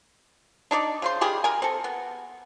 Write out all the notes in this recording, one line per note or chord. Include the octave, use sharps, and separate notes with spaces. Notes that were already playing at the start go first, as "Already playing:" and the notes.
D4 D#4 C#5 D5
C#3 C5 C6
D#3 G4 G#4 B5
A#4 G#5
C4 A4
B3